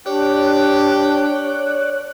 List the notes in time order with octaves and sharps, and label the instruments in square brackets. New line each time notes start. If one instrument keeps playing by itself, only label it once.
[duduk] D4 [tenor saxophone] G4 [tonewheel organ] C#5 D5 F#6